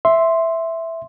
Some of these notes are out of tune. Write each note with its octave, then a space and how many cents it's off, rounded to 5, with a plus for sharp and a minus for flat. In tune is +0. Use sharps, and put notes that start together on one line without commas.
E5 +0 C6 +0